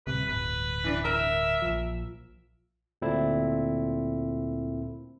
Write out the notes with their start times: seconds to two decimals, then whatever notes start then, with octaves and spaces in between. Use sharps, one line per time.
0.07 D1 C2 C3 B4
0.29 D1 G1 B4
0.84 E3 D4
1.05 A#4 E5
1.62 A#1 F3
3.02 D2 A#2 C4 E4 A4